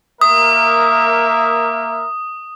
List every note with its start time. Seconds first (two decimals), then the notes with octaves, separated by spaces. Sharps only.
0.21 A#3 A#4 E5 D#6